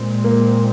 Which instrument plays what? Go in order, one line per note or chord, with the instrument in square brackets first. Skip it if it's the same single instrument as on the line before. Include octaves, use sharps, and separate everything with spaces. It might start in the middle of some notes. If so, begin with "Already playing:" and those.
Already playing: [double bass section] A#2 G#3 C4
[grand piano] A#3